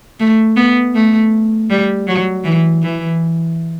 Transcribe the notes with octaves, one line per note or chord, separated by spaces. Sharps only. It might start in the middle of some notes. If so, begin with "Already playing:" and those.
A3
B3
A3
G3
F#3
E3
E3